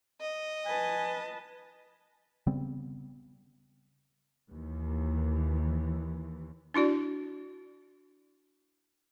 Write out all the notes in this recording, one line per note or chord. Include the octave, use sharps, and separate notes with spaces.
D#5
B4 G#5 A5
C#3 G3 B3 C4
D#2 E3
D4 E4 F#4 D5